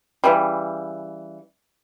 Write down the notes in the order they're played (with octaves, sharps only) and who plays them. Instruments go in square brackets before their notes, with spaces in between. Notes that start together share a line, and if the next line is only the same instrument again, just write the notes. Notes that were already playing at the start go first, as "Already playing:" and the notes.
[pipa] C#3 E3 G3